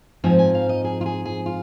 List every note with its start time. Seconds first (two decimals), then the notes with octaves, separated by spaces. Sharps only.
0.24 G#2 F3 C4 D#4 G#5
0.39 G#5
0.54 F5
0.69 D#5
0.84 G#4
1.01 F4
1.06 G#4
1.25 G#4
1.46 F4